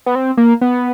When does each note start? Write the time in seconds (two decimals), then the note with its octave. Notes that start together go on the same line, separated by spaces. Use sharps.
0.06 B3
0.15 C4
0.37 A#3
0.61 B3